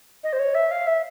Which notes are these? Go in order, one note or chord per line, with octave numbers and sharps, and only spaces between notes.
D#5
C5
C#5
E5
F5
E5